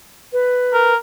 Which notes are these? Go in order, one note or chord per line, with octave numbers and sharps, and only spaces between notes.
B4
A#4